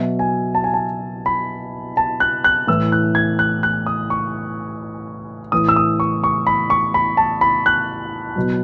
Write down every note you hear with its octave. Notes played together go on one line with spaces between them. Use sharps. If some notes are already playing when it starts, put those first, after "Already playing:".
Already playing: B2 F#3 E5
G#5
A5
G#5
A5
B5
A5
F#6
F#6
A2 E3 E6
F#6
G#6
F#6
F#6
D#6
C#6
A2 E3 D#6
E6
D#6
C#6
C#6
B5
C#6
B5
A5
B5
F#6
B2 F#3